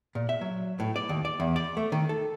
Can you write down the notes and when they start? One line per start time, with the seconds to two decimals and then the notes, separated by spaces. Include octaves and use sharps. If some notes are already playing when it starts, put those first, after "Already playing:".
0.15 A#2
0.29 E5
0.41 F#3
0.80 A2
0.96 D5
1.09 D#2
1.25 D5
1.40 E2
1.56 D5
1.77 A3
1.92 D#3
2.09 A4